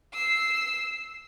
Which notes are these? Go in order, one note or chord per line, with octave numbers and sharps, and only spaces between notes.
E6 C7